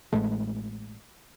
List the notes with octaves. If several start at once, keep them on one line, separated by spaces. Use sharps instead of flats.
A1 G#3 A3